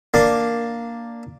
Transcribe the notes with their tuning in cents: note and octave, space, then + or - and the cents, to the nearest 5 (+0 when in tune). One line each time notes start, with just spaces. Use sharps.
A#3 +0 D4 +0